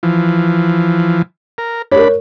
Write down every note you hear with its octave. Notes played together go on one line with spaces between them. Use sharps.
E3 F3
A#4
D4 A#4 C#5 B5